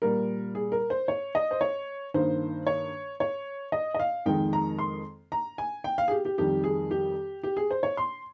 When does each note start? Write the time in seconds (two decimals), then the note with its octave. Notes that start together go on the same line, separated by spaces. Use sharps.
0.02 A#2 G3 A#3 A#4
0.55 G#4
0.72 A#4
0.90 C5
1.08 C#5
1.35 D#5
1.51 C5
1.61 C#5
2.14 G2 D#3 A#3 C5
2.67 C#5
3.20 C#5
3.72 D#5
3.94 D#5
4.00 F5
4.26 F2 D#3 G#3 G5
4.53 A#5
4.79 C6
5.32 A#5
5.58 G#5
5.84 G5
5.98 F5
6.08 G#4
6.11 G4
6.25 G4
6.38 F2 D#3 G3 G4
6.64 G#4
6.91 G4
7.43 G4
7.57 G#4
7.71 C5
7.83 C#5
7.97 C6